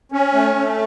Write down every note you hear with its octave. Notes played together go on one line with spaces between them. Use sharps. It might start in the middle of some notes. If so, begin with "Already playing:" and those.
C#4
A3
A3